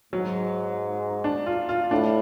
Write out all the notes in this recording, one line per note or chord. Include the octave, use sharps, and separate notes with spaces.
G#2 F#3
D4
F4
F4
A2 D4